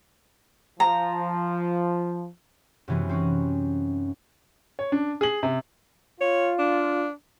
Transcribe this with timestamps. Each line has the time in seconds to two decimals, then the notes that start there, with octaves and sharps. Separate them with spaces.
0.80 F3 A#5
2.88 F#2 C3 E3 G#3 B3
3.09 C4 C#4 D#4 F#4
4.79 C#5
4.92 D4
5.21 G#4 F#7
5.43 C3
6.21 F4 C#5
6.59 D4